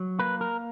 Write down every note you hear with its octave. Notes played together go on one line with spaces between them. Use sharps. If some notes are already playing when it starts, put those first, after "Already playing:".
Already playing: F#3
A#3 B4
A#4